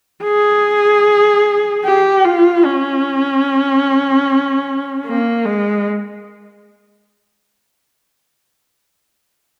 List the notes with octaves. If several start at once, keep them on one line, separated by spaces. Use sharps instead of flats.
G#4
G4
F4
C#4
A#3
G#3